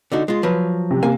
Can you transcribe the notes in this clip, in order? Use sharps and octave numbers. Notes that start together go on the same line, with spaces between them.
D3 D#4 F#4
G#3 F4
F3 F#3 B4
C3
C3 A#3 G#5